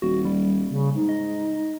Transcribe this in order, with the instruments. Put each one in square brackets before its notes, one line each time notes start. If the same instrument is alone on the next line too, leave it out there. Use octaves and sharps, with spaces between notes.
[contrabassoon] D#1 [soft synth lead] F#4
[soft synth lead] G3
[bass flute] C#3
[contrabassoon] G#2 [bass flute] D#4
[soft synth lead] D#5